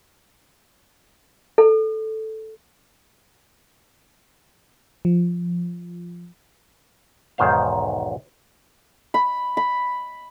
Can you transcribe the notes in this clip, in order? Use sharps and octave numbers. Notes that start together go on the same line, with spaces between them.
A4
F3
B1 E2 G#2 D#3 C5 F5
B5
B5